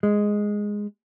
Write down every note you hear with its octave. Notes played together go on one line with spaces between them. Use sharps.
G#3